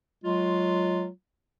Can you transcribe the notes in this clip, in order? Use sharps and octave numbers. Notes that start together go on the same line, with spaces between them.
F#3 G#3 F4